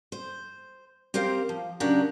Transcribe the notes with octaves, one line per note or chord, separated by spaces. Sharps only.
C5
C4 G4 A#4 C5 F5
F3
C#3 F#3 D4 F#4 G4 A#4